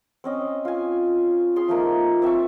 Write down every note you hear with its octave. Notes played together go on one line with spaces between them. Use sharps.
C4 C#4 D#5
F4 G#5
G#4 C6
F3 A3 A#3 D#4
C4 E5 A5 C#6